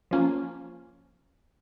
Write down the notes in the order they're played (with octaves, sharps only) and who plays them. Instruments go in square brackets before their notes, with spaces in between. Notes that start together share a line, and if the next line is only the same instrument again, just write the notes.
[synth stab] F3 A#3 C#4 F4